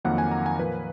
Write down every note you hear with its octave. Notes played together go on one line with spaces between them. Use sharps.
F2 D#3 F#3 A#3 F#5
G#5
A#5
G#5
A#2 F3 A#3 B4